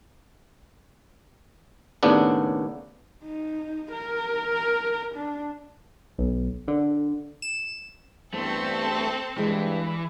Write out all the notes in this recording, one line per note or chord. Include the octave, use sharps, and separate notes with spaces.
D#2 A2 C#3 B3 D4
D#4
A#4
D4
B1
D3
E7
E2 G2 A3 C4 A4 C5
E2 G2 E3 G#3